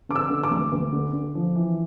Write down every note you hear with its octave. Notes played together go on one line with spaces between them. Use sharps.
D3 D6
E6
D3
D6
D2
D2
D3
D3
F3
E3